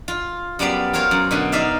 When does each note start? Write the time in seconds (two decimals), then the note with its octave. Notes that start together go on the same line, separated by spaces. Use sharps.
0.08 F4
0.59 F#2 G3 B3 D5 F5
0.93 F4 A#4 C5 C#5 F5
1.11 F#2
1.31 B2 D3
1.52 D#4 D5 E5 F5